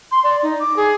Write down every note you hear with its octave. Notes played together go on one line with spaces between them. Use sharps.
C6
D5
D#4
D6
G#4